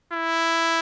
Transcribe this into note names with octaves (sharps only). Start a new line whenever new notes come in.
E4